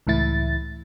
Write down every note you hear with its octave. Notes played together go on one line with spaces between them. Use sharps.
C#2 A2 E3 E4 A6